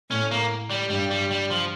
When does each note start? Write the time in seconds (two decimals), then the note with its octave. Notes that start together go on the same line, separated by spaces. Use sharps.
0.11 A2 C#4
0.31 A#3
0.70 G3
0.90 G2 G3
1.11 G3
1.31 G3
1.50 F3